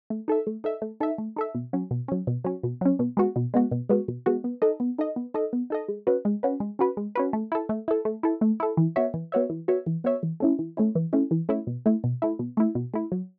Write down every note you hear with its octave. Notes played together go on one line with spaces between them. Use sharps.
A3
D#4 A4 E5
A3
D#4 A4 E5
A3
D#4 A4 E5
A3
D#4 A4 E5
B2
F#3 C#4
B2
F#3 C#4
B2
F#3 C#4
B2
F#3 C#4
B2
G#3 B3 F#4
B2
G#3 B3 F#4
B2
G#3 B3 F#4
B2
G#3 B3 F#4
B3
D#4 A4 D#5
B3
D#4 A4 D#5
B3
D#4 A4 D#5
B3
D#4 A4 D#5
G#3
C#4 F#4 B4
G#3
C#4 F#4 B4
G#3
C#4 F#4 B4
G#3
C#4 F#4 B4
A3
E4 A4
A3
E4 A4
A3
E4 A4
A3
E4 A4
E3
B3 F#4 C#5 E5
E3
B3 F#4 C#5 E5
E3
B3 F#4 C#5 E5
E3
B3 F#4 C#5 E5
E3
A3 C#4 E4
E3
A3 C#4 E4
E3
A3 C#4 E4
E3
A3 C#4 E4
B2
A3 E4
B2
A3 E4
B2
A3 E4
B2
A3 E4
F#3